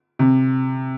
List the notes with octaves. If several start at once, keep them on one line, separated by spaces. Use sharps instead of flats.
C3